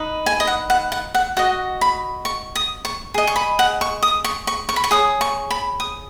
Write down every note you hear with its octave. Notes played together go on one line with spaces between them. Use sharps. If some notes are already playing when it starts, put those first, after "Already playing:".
Already playing: D#4 B4 D#5
G#5
D#5
F#5
F#5
F#5
F#5
F#4 D#5 F#5
B5
C#6
D#6
C#6
G#4 D#5
C#6
B5
F#5
C#6
D#6
C#6
C#6
C#6
B5
C#6
G#4 C#5 D#6
C#6
B5
D#6